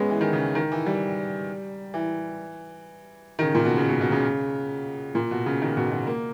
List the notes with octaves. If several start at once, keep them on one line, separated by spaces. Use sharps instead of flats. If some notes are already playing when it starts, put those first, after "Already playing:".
Already playing: G#3 B3 C#4
E3
D#3
C#3
D#3
E3
G3
E3
D#3
C#3
A#2
B2
C#3
B2
B2
C#3
A#2
B2
C#3
D#3
B2
B2
A#3